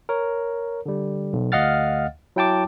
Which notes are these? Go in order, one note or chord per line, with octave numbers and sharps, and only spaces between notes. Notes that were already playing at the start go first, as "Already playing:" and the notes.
A#4 C#5
D3 G3
B1
D2 D#5 F5 F#5 F6 A6
F#3 E4 G5 A5 D6